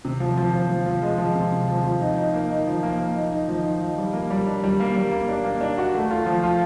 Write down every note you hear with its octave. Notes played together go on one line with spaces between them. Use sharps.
C3
F3
F3
F3
F3
F3
G#3
F3
C3
C3
F3
F3
D#4
D#4
A#3
D#4
F3
A#3
A#3
D#4
D#4
F3
D#4
F3
G3
A#3
G3
D4
G3
A#3
G3
A#3
D4
A#3
D4
F#4
A3
F4
F3
F4